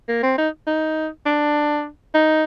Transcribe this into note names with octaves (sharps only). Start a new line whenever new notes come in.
A#3
C4
D#4
D#4
D4
D#4